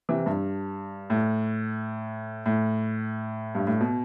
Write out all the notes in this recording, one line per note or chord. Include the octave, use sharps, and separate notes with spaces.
C3 E3
G2
A2
A2
G2
A2
B2